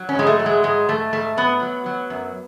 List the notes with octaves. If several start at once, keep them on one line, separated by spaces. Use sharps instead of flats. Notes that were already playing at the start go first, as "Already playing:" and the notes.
Already playing: F#3
C#4
G#2 G#3
A3
F#3
G#3
G#2 G#3
G#2 A3
G#2 A3
F#3 B3
F#3
F#3
F#2